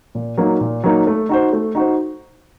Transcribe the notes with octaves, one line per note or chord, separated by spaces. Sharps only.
A#2
F#3 A#3 D#4
A#2
F#3 A#3 D#4
A3
D#4 F#4 C5
A3
D#4 F#4 C5